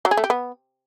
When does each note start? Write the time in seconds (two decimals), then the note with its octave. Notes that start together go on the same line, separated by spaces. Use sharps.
0.05 F#3
0.11 G#4
0.17 A3
0.24 G4
0.30 B3